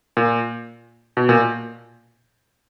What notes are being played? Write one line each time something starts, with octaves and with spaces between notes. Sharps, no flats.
A#2
B2
A#2